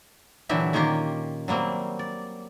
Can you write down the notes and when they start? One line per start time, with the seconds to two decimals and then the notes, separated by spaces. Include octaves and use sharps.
0.49 A#2 D3 E3 F#3 G4 E5
0.73 D#3 A#3 C#4 F4 G4 A#4
1.48 F#3 G3 A#3 C4
1.99 D5